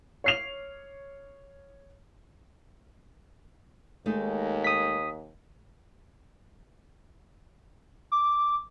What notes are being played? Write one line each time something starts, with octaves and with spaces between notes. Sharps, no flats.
C#5 C7 F7
D#2 G#3 A3 D#4
D#6 B6
D6